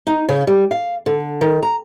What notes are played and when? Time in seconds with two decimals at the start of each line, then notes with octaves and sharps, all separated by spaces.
0.07 D#4
0.29 C#3
0.47 G3
0.71 F5
1.06 D3
1.41 D#3
1.63 A#5